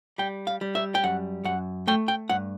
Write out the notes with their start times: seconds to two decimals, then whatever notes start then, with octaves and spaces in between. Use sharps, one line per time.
0.18 G3 G5
0.47 F5
0.61 G3
0.75 E5
0.95 G5
1.04 F#2 F#5
1.44 F#2 F#5
1.87 A3 G5
2.08 G5
2.29 G2 F#5